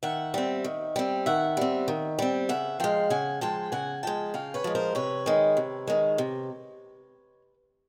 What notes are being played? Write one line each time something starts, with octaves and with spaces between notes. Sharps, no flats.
D#3 E5 F#5
G3 C4
D#3
G3 C4
D#3 E5 F#5
G3 C4
D#3
G3 C4
C#3 E5 F#5
F3 G#3 F5 G5
C#3 F#5 G#5
F3 G#3 G5 A5
C#3 F#5 G#5
F3 G#3 G5 A5
C#3 F5 G5
B4 C#5
F3 G#3
A#4 C5
C3 B4 C#5
D#3 G#3
C3
D#3 G#3
C3